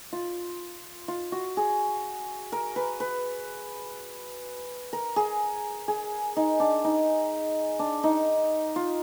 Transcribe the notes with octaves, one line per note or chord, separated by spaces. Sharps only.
F4
F4
F#4
G#4
A#4
B4
B4
A#4
G#4
G#4
D#4
D4
D#4
D4
D#4
F4